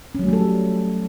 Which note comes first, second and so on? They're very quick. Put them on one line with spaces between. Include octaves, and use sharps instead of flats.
C#4 F#3 A3 G3 A4